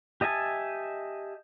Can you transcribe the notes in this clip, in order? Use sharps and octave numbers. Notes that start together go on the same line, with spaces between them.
G4 D#5 E5 G#5 A5